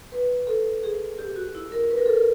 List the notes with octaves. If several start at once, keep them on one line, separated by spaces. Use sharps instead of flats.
B4
A4
G#4
G4
F#4
E4
A#4
B4
A#4
A4
A#4